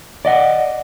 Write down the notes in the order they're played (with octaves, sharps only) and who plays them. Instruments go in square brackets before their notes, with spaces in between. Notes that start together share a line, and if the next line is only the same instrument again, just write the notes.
[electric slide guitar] D5 D#5 F#5